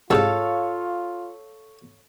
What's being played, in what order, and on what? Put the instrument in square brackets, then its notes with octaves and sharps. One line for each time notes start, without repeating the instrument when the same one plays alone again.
[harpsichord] C2 G#2 [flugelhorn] F4 [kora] A4 [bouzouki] C#5 F5